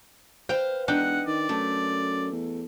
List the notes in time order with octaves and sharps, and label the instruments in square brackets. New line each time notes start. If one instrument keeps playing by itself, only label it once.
[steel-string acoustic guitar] B4 C5 F5 [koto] G5
[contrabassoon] E1 [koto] D4 G5 [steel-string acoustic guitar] D#4 [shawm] F#5
[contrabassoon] D#3 [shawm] D5
[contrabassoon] F#2 [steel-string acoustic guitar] A3
[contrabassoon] E2